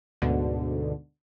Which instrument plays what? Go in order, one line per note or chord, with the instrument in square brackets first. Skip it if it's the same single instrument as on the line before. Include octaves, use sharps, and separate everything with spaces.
[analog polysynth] D2 G#2 B2 D3